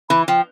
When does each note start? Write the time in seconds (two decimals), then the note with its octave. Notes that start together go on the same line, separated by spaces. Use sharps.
0.09 E3 B5
0.28 F3 G5